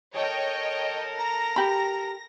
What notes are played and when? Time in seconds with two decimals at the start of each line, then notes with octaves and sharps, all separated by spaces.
0.14 A4 A#4 C#5 D#5 G5
1.18 A#5 A#6
1.56 G4 B5